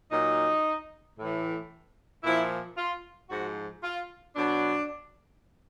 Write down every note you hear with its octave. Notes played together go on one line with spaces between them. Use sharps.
A#2 F#3 D#4
A2 E3
A#2 F3 E4
F4
G#2 F3 F#4
F4
B2 F#3 D4